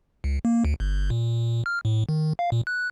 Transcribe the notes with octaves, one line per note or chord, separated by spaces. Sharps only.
C#2
A#3
D2
G1
A#2
F6
A2
D#3
F5
A#2
F#6